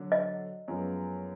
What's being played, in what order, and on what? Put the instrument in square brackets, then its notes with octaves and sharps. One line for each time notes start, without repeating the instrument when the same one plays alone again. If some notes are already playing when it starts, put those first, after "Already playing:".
Already playing: [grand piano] D3 F#3 D4
[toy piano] D#5
[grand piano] F#2 F3 G#3 B3